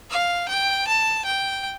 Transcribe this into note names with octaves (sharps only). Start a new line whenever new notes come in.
F5
G5
A5
G5